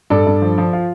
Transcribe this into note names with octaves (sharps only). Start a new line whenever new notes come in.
G2 A4 D5
G2
F3
F3
F4